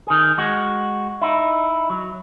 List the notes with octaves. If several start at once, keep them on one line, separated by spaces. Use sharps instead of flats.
D#3 G#4
G#3 F#4
D#4 E4
F#3